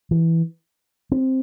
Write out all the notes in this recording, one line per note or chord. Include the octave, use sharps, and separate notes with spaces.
E3
C4